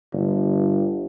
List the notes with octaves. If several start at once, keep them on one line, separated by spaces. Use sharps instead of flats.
G1